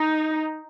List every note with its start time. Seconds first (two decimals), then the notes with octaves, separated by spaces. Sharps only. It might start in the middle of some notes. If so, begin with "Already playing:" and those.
Already playing: D#4